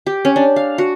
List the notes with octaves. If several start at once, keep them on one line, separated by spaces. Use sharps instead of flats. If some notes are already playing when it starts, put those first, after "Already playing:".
G4
C#4
D4
F5
F#4